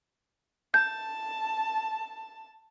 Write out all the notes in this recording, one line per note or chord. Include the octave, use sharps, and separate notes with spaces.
A5 G6